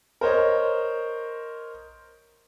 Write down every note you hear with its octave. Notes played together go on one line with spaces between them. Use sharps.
A#4 C5 C#5 D#5